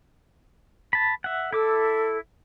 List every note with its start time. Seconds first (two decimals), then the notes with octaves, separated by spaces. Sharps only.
0.93 A5 B5
1.24 E5 F#5
1.53 E4 A4 D6 E6